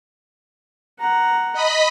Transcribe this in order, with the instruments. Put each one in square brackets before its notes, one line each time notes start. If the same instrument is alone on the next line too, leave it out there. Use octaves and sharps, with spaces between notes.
[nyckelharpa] F#5 A#5
[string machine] D#5 B5